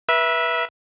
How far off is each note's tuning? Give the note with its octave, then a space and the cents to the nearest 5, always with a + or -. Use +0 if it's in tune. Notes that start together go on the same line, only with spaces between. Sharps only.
B4 -30 E5 +0